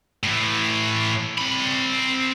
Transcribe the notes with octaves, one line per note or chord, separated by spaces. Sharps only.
A2 E3
C4 B5